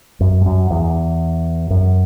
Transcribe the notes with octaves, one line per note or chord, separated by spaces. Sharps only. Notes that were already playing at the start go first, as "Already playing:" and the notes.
F#2
G2
F#2
E2
F#2